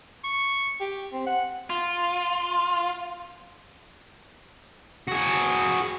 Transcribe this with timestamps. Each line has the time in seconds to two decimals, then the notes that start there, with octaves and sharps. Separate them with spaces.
0.24 C#6
0.80 G4
1.13 C4
1.26 F#5
1.70 F4
5.08 F#4 G#4